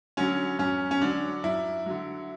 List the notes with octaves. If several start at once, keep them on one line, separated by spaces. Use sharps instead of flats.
D3 F#3 C#4
F#2 C#4
C#4
D3 F#3 D4
F#2 E4
D3 F#3